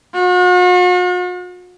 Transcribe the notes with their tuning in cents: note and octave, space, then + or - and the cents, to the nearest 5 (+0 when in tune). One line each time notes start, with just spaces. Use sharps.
F#4 -45